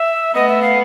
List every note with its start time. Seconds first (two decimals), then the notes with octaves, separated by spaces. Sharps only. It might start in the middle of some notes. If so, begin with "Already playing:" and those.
Already playing: E5
0.35 A3 B3 D#5
0.49 E5
0.62 F5